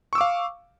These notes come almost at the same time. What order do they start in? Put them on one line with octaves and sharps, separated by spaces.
C#6 E6 D6 F5